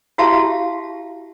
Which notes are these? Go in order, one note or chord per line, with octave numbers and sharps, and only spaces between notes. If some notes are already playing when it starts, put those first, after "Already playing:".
E4 F#4 G4 E5 F5 A5